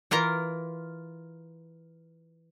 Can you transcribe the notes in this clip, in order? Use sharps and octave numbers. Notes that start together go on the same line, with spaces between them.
E3 F4 A#4 A#5